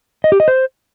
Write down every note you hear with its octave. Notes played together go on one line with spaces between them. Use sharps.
D#5
G4
D#5
C5